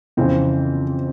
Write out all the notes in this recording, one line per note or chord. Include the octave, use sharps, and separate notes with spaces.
F2 C#3 E3 C4